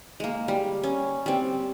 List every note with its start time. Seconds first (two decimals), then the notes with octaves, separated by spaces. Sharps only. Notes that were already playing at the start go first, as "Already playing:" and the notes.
0.20 G#3 A#3
0.48 G3
0.83 C#4
1.26 G3 C4